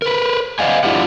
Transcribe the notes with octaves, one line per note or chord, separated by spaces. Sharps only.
A#4 B4
C5 D5 D#5 F5 F#5 G#5
F#3 D4 E4 F4 G4 F#5